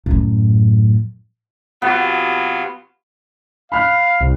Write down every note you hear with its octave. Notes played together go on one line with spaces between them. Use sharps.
F#2 A2
C3 F#3 B3 F4
F5 B5 F6 F#6
C2